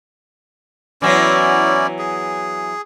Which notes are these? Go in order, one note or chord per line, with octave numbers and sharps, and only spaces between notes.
E3 F#3 B3 C#4 E4 D5
G#4